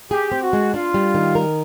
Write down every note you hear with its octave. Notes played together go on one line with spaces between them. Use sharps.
G4 G#4
C4
F#4
G#3
D4 F4
G3
D#3
A#4